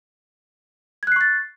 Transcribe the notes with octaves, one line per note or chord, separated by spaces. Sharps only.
C#6 F#6 G#6 A6 C7